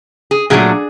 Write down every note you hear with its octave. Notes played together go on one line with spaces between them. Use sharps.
G#4
A#2 F#3 A3 D4 G#4